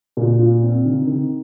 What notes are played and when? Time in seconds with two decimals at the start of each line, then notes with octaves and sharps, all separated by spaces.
0.17 A#2
0.39 F4
0.62 C4
0.85 D#3
1.07 D#3